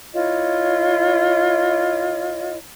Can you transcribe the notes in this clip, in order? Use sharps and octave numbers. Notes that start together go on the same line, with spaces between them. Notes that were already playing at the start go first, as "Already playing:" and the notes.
E4 F4 C#5 D#5